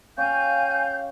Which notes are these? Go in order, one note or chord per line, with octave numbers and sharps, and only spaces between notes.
C#4 G4 F5 G#5 G6